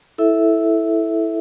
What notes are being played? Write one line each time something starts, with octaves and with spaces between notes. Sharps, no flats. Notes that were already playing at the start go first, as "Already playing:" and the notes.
E4 A4 E5